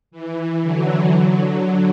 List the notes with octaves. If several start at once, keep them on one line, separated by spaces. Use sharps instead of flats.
E3
D3 F#3
D3 F#3